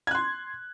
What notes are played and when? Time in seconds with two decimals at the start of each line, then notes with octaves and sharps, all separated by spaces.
0.07 G#6
0.11 F#6
0.15 C6